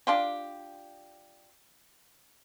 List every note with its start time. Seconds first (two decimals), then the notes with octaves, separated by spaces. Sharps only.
0.07 D4 F4 G4